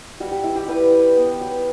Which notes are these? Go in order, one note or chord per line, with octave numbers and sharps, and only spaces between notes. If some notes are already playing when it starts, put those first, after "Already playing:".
G3 F#4
G4
E4
G4
G3 G4 B4
G3
B3
F#3